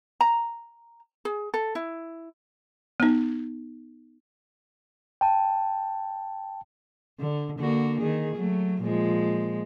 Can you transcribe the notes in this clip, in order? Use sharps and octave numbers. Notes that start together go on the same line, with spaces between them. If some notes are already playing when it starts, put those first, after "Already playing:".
A#5
G#4
A4
E4
B3 D#4
G5 A5
D3
D3 A#3 F#4
D#3 G#4
F#3 A3
A#2 F3 G#3